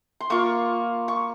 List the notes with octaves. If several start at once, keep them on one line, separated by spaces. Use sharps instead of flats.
C6
A#3 F4 C#6
C#6